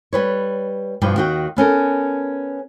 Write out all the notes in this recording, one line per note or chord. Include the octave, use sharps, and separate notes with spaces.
G3 B4 C#5
G2 B2 F3 B3 G5
D#2 D#3 F#4 D#5 G5
B3 C#4 A4 A#4